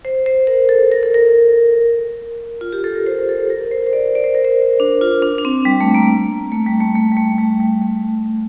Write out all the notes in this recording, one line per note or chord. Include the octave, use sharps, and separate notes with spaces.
C5
C5
A#4
A4
A#4
A4
A#4
F4
G4
A4
A#4
C5
A4
A#4
C5
C5
D5
D5
C5
A#4
C5
D4
F4
D4
D4
C4
G3
A3
A#3
A3
G3
A3
A3
G3
A3
G3
G3
A3